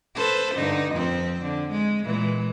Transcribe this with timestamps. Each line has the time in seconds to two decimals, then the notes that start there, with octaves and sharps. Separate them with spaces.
0.15 A4 B4 C5
0.54 G2 D3 D#4
0.92 F2 F3 C4
1.42 D3
1.71 G#3
2.04 A#2 E3 G#3